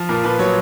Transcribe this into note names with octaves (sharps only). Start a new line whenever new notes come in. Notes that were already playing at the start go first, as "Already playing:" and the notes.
Already playing: F3
A#2 A#4
A#2 B4
F#3 C#5